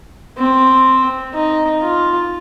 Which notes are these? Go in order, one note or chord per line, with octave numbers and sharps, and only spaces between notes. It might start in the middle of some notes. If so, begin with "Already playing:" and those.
C4
D#4
F4